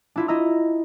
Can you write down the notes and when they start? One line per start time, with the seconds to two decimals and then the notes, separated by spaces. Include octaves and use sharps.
0.16 D4 E4 F4
0.28 E4 D#5 A#5 E6